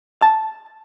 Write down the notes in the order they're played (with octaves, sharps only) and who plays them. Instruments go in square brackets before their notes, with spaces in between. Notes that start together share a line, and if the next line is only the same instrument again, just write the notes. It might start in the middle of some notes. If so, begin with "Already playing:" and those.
[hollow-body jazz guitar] A5